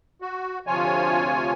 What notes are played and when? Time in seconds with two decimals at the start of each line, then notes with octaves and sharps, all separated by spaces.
0.22 F#4
0.67 D2 C3 F3 F4 C#5 G#5